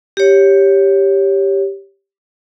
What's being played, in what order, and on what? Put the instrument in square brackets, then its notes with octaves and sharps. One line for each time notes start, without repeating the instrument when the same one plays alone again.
[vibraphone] G4 C#5